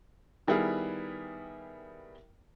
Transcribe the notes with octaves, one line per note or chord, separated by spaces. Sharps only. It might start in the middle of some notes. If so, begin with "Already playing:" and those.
D#3 G3 B3 E4 G#4 A#4